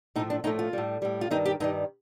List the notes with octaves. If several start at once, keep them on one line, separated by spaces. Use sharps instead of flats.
A2 F3 A3 D#4
D4
A2 F3 A3 D#4
F4
A2 G3
A2 G3
F4
G2 D#3 G3 D#4
G4
G2 D#3 G3 D#4